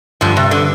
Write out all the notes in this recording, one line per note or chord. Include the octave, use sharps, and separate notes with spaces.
G2 D3 F3
C3
D3